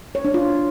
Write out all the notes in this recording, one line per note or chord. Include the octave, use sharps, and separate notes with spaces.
C#5
D4
F4